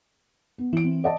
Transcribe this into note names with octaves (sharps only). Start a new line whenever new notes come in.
B3
E3 E4 D7
C4
D5 D#5 A5